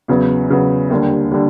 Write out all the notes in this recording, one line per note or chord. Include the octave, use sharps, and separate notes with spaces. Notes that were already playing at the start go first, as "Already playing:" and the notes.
E2 C#3 F#3 B3
E2 C#3 F#3 B3
D#2 D3 G3
D3 G3